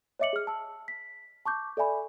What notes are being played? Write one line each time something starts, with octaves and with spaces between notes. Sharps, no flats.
C#5 D#5 E5 D6 C#7 F#7
G#4 F6
A5 E6
B6
A5 C#6 D6 G6
A4 D5 E5 G#5 B5